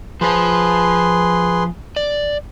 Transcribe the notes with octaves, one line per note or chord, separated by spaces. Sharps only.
F3 G#4 B4 C5 C6
D5